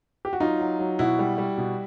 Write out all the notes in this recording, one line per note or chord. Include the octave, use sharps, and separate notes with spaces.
G4
F#4
F#3 D#4 F4
F#3
F#3
B2 E4 F#4
G3
G3
B2